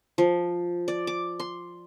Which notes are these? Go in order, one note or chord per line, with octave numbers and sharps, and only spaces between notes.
F3
D5
D6
C6